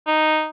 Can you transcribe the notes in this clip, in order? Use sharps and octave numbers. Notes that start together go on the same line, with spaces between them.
D#4